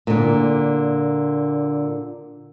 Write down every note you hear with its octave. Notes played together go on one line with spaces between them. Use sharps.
A#2 D3